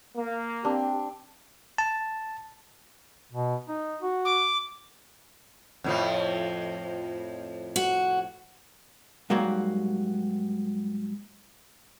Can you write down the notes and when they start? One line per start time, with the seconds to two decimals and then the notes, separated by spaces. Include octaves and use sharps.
0.15 A#3
0.65 C4 D4 G4
1.78 A5
3.32 B2
3.69 D#4
4.02 F#4
4.25 D6
5.84 F2 A2 F3
7.76 F#4
9.30 G#2 F#3 G3 A#3 F#4